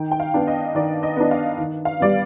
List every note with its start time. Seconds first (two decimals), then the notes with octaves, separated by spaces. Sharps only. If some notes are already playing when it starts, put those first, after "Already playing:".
Already playing: D#3 G5
0.11 G5
0.20 F5
0.34 B3 D4
0.47 D#5
0.75 D#3 D5
1.03 D#5
1.16 B3 D4
1.31 F5
1.58 D#3
1.85 F5
2.00 G3 B3 D5